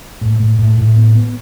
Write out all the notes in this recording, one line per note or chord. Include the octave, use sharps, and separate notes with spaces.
A2
A2
A2
A2
B3
B3